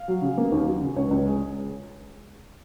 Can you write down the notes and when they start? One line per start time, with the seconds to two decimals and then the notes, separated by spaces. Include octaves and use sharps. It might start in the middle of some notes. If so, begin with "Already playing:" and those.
Already playing: F5
0.08 F#3
0.22 C#3
0.38 A#3
0.52 D#2
0.66 F#3
0.81 C#3
0.96 C#2 C#5
1.11 C#2
1.26 G#3